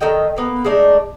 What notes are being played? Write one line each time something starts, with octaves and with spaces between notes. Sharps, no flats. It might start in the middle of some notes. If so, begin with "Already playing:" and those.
D#3 A4 D#5 G5
A#3 B3 B4
G#3 A3 D4 D#4